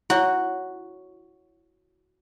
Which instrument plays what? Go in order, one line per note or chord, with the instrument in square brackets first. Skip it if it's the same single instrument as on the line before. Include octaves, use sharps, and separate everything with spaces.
[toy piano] E4 C#5 [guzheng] F#4